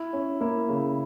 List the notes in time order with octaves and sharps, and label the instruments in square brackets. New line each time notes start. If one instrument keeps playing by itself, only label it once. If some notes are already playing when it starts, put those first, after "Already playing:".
Already playing: [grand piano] E4
[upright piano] C#4
[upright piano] A#3 [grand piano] E4
[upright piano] C#3